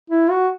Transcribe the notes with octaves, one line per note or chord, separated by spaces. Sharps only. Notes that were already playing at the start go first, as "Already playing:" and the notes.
E4
F#4